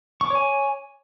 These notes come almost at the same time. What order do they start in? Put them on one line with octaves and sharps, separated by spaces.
C#6 D6 C#5 G#5